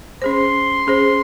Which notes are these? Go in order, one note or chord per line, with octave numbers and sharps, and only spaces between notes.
C#4 G#4 C5 C6
C#4 G#4 C5